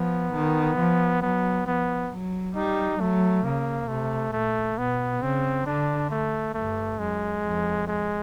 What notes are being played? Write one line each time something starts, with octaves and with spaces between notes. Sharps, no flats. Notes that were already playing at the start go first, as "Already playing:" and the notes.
Already playing: F3 B3
D#3
F3
F#3 B3
F3 B3
F#3
G3 D#4
F#3 A3
C#3 A#3
C3 A3
A#2 A3
B2 B3
C#3 C4
D3 D4
A3
G2 A3
F#2 G#3
F2
G#3